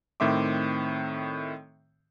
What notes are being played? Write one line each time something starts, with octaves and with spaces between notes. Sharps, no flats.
A2 D#3 C4 E5 C6 D6